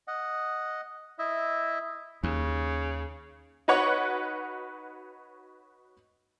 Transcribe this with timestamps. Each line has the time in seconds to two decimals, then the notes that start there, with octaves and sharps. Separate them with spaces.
0.08 D#5 F#5
1.19 E4 D#5 E5
2.23 D#2 C#3
3.68 D#4 F#4 B4 C#5 F#5 C#6